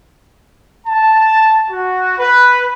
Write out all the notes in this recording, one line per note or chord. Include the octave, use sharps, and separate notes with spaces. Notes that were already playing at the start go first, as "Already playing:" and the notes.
A5
F#4
B4